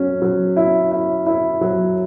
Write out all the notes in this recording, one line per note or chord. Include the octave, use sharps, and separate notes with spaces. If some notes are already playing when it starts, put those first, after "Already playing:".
Already playing: F#3 C#4
F#3
E4
E4
E4
F#3